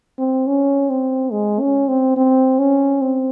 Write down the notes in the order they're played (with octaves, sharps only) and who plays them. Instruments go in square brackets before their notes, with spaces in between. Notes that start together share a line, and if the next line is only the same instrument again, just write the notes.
[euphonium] C4
C#4
C4
G#3
C#4
C4
C4
C#4
C4